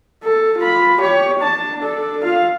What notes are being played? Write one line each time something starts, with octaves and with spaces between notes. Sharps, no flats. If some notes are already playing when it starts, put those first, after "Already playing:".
A4
F4 B5
G4 C#5
D4 A5
D4 A4
F4 F5